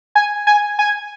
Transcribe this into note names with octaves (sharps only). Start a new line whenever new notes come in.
G#5
G#5
G#5